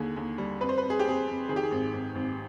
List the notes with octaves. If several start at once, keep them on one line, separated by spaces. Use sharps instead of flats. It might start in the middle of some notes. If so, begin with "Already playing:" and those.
Already playing: D#2 D3 G#4
D#2
G3
F2 B4
C5
B4
F2
G#4
G4
F2 G#4
F2
D#3 G#4
G4
G#4
G#1
G#1
G#1